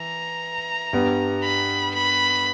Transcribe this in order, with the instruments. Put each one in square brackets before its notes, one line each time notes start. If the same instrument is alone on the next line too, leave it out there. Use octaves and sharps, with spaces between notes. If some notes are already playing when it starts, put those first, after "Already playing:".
Already playing: [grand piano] E3 [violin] A#5
[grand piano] G2 G3 B3
[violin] B5
B5